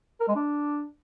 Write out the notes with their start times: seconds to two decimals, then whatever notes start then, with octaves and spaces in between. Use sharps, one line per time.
0.20 A#4
0.28 G#3
0.36 D4